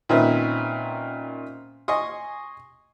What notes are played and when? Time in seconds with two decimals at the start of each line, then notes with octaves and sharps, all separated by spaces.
0.09 A#2 D#3 C4 C#4 B4 E5
1.88 D#5 G#5 C6 C#6 D#6